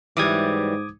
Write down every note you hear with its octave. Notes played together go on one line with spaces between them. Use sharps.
G#2 E3 F#3 G3 D6 D#6 G#6